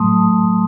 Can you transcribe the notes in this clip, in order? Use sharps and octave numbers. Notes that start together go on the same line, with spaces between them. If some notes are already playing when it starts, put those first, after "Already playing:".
Already playing: A2 F#3 A3 A5 C6 D#6